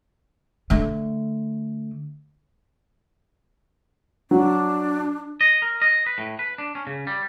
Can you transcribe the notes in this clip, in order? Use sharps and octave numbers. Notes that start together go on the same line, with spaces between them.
D3 A3
F#3 D4
D#5
A#4
D#5
B4
A2
B4
D4
C#4
C#3
G3